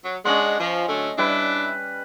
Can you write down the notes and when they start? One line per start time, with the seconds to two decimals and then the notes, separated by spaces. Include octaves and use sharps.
0.05 F#3
0.25 G#3 C#4 D4 D#5 F#5 C6
0.60 F3
0.89 D3 F#3 A3
1.18 G3 D4 E4 B4